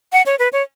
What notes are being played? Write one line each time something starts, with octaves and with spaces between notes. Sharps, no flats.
F#5
C#5
B4
C#5